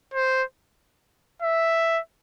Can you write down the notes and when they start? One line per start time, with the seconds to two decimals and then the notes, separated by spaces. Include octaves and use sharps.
0.14 C5
1.42 E5